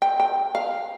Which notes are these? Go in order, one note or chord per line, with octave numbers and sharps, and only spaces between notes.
G5
G5
F5